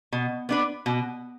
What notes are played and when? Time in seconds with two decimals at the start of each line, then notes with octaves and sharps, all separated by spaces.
0.12 B2
0.49 B3 D4 B4
0.86 B2